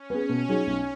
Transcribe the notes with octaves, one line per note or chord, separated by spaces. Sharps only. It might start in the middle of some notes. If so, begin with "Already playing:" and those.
Already playing: C#4
B3 G#4
B2
F#3 D#4 G#4
B1